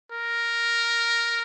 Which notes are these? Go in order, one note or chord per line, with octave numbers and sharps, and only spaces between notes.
A#4